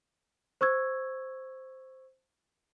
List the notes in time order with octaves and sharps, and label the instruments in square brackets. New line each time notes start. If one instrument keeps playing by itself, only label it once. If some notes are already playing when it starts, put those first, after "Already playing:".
[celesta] C5 C#6 E6 G#6